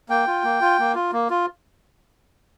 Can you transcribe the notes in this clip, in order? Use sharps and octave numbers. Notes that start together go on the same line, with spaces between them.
A#3 G5
F4
A#3
F4
A#3
F4
A#3
F4